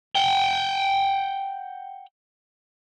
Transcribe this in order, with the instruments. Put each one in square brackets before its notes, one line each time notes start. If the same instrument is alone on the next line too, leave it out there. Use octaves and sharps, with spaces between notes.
[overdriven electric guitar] F#5 G5